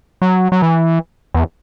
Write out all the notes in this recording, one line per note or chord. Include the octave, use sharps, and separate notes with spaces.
F#3
F#3
E3
E2